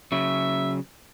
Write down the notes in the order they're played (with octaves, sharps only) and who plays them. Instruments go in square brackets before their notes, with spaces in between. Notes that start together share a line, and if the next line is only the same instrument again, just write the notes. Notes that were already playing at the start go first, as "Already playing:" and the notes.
[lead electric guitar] C#3 F#3 [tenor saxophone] E5